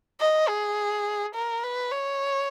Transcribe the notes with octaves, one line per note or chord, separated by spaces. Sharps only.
D#5
G#4
A#4
B4
C#5